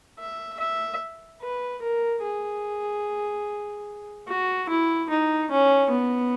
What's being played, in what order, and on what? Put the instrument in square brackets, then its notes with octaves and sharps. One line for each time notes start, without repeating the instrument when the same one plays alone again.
[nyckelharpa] E5
E5
B4
A#4
G#4
F#4
E4
D#4
C#4
B3